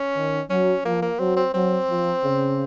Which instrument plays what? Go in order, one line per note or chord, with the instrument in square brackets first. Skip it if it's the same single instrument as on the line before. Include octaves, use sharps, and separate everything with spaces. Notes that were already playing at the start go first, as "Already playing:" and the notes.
Already playing: [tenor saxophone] C#4
[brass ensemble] D#3
[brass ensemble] F#3 [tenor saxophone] C#4
[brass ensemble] F3 [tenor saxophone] A#3
[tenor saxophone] A#3
[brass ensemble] F#3 [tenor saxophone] C4
[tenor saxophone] C4
[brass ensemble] F#3 [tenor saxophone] C4
[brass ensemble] F3
C#3